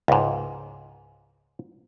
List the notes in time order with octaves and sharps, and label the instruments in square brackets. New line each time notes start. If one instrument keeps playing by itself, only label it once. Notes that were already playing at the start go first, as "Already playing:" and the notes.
[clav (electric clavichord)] C#2 G#2